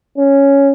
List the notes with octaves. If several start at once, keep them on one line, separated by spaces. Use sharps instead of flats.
C#4